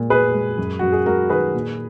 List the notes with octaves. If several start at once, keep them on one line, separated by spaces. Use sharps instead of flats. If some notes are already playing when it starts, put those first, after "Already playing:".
Already playing: A#2 G#3
A#2 G#4 B4
G#3
F#2
F#2 F#4
G#4
G#3 F#4 A#4
D#3 G#4 B4
A#2